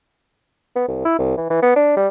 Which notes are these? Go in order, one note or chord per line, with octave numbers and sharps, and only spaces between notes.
B3
C2
E4
C2
E3
E3
B3
D4
G3